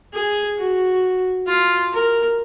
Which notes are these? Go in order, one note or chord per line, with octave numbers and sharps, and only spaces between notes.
G#4
F#4
F4
A#4